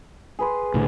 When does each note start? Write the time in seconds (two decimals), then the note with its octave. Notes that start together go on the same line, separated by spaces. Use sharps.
0.39 G#4 B4 C6
0.74 C2 A2 D3